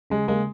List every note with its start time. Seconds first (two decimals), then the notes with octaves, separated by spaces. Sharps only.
0.10 C#3 G#3
0.28 G#3 A#3